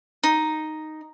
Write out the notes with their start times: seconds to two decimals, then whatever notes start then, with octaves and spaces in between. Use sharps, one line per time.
0.24 D#4